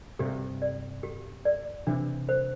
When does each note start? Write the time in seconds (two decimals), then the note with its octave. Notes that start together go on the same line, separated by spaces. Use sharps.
0.19 G2 C3 G4
0.62 D5
1.03 G4
1.45 D5
1.87 C3 E3 D4
2.29 C5